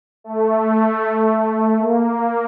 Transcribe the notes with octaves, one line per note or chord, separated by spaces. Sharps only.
A3
A#3